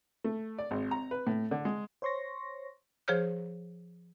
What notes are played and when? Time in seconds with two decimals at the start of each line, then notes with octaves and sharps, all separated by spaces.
0.24 A3
0.58 D5
0.71 G#1
0.91 A#5
1.11 B4
1.27 A2
1.51 D3
1.65 G#3
2.02 C5 C#5 C6 C#6 A#6
3.08 F3 G#4 C5 C#5 F6 G6